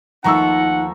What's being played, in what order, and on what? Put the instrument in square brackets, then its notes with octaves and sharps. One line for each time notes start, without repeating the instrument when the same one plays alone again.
[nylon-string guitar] D#2 F3 A3 [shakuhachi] D#4 [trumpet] F#5 [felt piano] A#5 C#6 E6